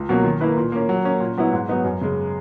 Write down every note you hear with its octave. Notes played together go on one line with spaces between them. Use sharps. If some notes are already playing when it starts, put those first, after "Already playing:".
Already playing: C#2
B2 F#3 A#3 C#4
D#3
A#3 E4 B4
A#2
A#3 C#4
F#3
A#3 C#4
A#2
F#3 B3 E4
G#2
F#3 B3 D#4
F#2
C#3 G#3